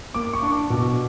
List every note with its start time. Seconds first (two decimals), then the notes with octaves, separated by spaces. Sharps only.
0.14 A#3 D6
0.33 C#6
0.43 D4
0.52 D6
0.70 B2